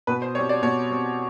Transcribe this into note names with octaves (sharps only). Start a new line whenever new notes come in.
B2 B4
C5
G3 C4 C#5
D5
B2 C#5
G3 C4